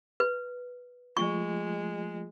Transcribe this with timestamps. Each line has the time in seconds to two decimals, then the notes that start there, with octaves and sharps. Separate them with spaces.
0.20 B4
1.17 F3 G#3 A3 F4 C#6